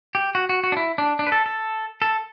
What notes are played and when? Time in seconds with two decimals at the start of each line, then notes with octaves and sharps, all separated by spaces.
0.15 G4
0.35 F#4
0.49 F#4
0.64 F#4
0.72 D4
0.77 E4
0.98 D4
1.19 D4
1.27 B4
1.32 A4
1.46 A4
2.02 A4